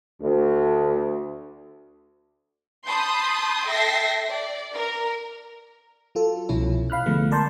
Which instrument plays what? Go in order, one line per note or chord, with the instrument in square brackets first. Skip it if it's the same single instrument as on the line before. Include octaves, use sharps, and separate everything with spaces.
[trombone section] D2
[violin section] A5 B5 C6 D#6 G6
A4 E5 G5 A#6 C7
D5
A#4
[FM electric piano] F#3 F4 A4
C2 B2 F3 C#4 E4
F5 B5 F6 F#6
D3 F3 G#3 A3 B3
A#4 D5 A5 C6 G6